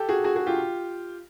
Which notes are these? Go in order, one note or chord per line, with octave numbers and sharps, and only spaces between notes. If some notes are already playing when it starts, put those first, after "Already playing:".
Already playing: G4 A4
F#4 G#4
F#4 G#4
F#4 G#4
F4 G4